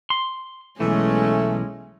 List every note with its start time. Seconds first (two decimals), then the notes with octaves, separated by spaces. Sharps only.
0.10 C6
0.80 B1 E3 G#3 A3 C#4